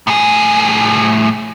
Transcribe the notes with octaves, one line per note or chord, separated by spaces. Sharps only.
A2 G#4